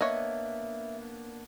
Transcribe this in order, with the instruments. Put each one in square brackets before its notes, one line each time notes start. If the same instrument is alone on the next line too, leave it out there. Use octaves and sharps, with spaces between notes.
[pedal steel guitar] A#3 B3 D4 [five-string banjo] C#5 D#5 [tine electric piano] E5